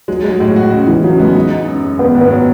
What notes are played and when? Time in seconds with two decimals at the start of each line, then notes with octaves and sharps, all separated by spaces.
0.08 F#3 G#3
0.24 G#3
0.31 F#3
0.40 A2 G#3
0.56 F#4
0.72 C#3 G#3
0.87 C#3 E3
1.04 C#3 F#3
1.19 G#3 B3
1.36 D#4
1.52 D#4
1.68 F#2
1.84 G#3
1.99 D#3 B3
2.15 G#2
2.21 B3
2.31 F#3